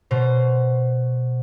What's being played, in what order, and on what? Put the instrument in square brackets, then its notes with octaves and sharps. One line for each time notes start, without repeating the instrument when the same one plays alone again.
[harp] B2 C5